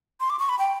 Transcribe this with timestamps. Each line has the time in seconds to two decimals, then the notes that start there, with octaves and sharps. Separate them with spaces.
0.20 C6
0.30 D6
0.39 C#6
0.49 B5
0.59 G5